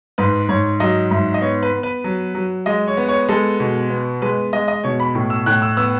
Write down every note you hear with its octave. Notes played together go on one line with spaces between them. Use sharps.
G#2 B4
G#2 C#5
F#3 D#5
G#2 E5
D#5
B3 C#5
B4
B3
B4
F#3
F#3
G#3 D#5
C#5
B3
C#5
G#3 A4
B2
B3
G#3 B4
G#3 D#5
D#5
B2 C#5
B5
A2
E6
A2 F#6
E6
B3 E6